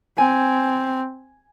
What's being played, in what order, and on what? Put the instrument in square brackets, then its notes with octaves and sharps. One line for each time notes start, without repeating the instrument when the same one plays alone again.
[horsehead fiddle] C4 [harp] G#5